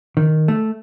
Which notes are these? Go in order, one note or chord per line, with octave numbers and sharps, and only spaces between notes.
D#3
A3